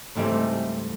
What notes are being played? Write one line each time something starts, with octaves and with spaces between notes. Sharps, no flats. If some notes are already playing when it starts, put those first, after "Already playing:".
C#2 G#2 E3 G3 A3 C4